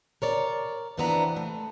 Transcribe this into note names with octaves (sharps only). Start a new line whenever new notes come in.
A#4 C#5 D5
C3 E3 F3 B3 D4 A#5
A3